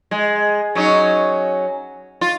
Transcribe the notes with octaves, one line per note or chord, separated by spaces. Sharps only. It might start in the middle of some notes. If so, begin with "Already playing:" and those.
G#3
F#3 C#4 D#4
F4